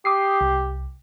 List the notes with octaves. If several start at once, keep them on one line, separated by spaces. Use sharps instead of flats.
G4 D6 D#6 C7
C2